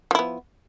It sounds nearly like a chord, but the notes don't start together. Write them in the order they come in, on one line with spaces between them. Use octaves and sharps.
F3 E4 B3